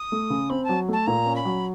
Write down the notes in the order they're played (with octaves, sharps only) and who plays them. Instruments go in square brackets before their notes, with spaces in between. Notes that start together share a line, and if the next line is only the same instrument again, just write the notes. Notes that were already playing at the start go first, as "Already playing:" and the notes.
Already playing: [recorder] D#6
[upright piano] A3
C#3
[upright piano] C4 [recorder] B5
[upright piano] F#3 [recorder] A5
[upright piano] A3 [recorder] A5
[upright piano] A#2 [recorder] A#5
[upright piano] C#4
[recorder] B5
[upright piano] F#3